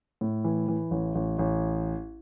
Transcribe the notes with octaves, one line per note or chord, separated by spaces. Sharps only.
A2
E3
E3
A1
A1
A1